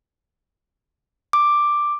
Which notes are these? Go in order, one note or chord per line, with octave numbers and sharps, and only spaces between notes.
D6